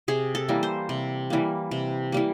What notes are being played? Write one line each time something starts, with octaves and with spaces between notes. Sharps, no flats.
C3 G#4
A4
E3 G3 A#3
C5
C3
E3 G3 A#3
C3
E3 G3 A#3